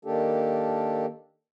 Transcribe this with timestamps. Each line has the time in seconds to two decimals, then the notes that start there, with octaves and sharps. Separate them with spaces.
0.05 D#3 A#3 D4 G4 A4